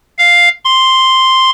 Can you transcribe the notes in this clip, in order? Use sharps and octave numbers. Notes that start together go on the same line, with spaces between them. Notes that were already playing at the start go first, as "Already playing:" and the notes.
F5
C6